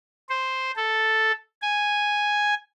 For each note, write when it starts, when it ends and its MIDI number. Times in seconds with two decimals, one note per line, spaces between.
0.30 0.71 72
0.76 1.32 69
1.62 2.55 80